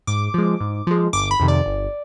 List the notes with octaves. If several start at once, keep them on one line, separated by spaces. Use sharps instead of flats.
G#2 D6
F3 G#3
G#2
F3 G#3
G1 D6
B5
F2 C3 D#3
D5
G1